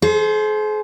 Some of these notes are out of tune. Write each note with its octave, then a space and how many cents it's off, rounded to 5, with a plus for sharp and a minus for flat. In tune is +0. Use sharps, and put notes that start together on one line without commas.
G#4 +45 C5 +0